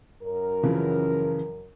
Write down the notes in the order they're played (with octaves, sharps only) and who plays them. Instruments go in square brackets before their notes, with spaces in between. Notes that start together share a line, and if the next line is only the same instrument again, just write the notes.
[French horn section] F#2 A#4
[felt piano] C#3 E3 F3